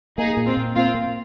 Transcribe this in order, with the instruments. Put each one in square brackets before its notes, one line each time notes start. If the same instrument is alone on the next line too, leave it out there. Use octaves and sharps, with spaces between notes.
[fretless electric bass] A#3 [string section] D#4 G#4
[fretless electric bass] A#2
[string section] C4 F4
[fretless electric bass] A#2
[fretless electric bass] A#3 [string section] C4 F4
[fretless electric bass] A#3